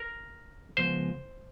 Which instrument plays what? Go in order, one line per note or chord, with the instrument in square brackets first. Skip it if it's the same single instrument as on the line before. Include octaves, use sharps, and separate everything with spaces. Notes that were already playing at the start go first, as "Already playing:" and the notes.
Already playing: [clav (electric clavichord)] A#4
[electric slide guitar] C#3 F3 G#3 B3 [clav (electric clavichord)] C5